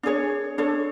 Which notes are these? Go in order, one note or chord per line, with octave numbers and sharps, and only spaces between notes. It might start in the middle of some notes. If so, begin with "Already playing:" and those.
D4 G#4 C#5
D4 A4 C#5